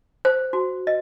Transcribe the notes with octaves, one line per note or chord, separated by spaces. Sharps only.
C5
F#4
D#5